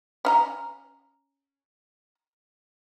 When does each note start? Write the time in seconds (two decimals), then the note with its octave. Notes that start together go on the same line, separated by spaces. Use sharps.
0.25 C#4 F5 A#5